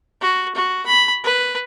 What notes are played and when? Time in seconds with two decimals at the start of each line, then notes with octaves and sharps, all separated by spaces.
0.21 F#4
0.55 F#4
0.86 B5
1.23 B4